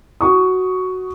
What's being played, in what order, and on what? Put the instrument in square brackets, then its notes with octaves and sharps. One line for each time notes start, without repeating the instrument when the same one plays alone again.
[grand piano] F#4 C#6 D#6